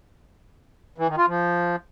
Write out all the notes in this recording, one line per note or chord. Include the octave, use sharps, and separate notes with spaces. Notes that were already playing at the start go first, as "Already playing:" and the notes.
E3
D#3
F4
F3